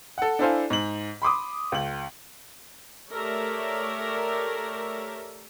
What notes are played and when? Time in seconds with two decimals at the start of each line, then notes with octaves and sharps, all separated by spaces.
0.18 A4 F#5
0.39 D4 E4 A4 C5 F5 G#5
0.70 G#2 F#7
1.22 B5 C6 D6 D#6
1.72 C#2 F#7
3.12 A3 G4 A#4 C#5 D5 E5